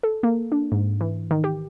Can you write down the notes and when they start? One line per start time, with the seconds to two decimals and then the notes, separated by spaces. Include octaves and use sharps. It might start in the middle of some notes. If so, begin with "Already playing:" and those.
0.03 A4
0.23 A#3
0.52 D4
0.72 G#2
1.01 E3
1.31 D#3
1.44 G4